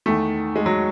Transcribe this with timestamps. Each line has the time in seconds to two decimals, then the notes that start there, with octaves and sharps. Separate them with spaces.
0.06 E2 D#3 A3
0.56 G#3
0.66 F#3